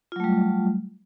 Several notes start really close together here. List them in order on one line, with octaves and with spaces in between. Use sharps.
F4 F#3 A3 G3